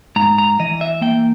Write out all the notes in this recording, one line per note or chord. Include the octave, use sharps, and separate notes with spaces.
G#2 A#5
A#5
E3 D#5
E5
A#3 G5